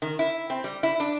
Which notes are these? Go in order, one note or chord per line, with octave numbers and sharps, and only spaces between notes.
D#3
E4
C4
G3
E4
D4